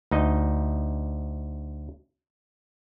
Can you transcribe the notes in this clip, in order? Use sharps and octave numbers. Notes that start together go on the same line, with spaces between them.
D2 D#4 D#5